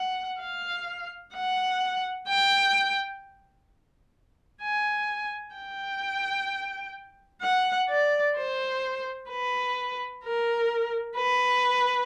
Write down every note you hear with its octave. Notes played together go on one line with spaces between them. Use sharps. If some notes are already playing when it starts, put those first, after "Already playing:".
Already playing: F#5
F5
F#5
G5
G#5
G5
F#5
D5
C5
B4
A#4
B4